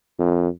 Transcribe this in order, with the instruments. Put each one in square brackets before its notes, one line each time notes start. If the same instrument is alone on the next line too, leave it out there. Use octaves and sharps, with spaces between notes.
[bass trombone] F2